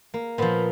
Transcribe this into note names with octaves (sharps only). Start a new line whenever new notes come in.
A#3
A#2 F3 B3